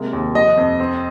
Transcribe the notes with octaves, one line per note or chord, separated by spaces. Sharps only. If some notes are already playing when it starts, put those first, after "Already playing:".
Already playing: C3 G#3 A#3
D#2
F3 D#5
F2
C4